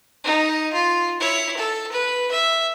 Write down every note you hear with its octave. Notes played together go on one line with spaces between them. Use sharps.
D#4
F4
E4 C#5
A4
B4
E5